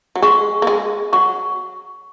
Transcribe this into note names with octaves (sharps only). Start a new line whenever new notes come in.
F#3
G#3 F#5 C#6
A#3
G#3 G#4
F#3 F#5 C#6